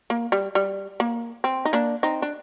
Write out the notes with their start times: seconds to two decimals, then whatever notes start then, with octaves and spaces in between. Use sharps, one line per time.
0.10 A#3
0.32 G3
0.55 G3
1.00 A#3
1.44 C4
1.65 D#4
1.73 A#3 D4
2.03 C4 D#4
2.22 D4